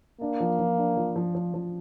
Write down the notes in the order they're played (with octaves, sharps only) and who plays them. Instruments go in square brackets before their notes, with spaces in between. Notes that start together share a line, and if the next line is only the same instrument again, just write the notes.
[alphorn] A#3 [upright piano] D4
[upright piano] F3
F3
D4
F3
F3
F3
F3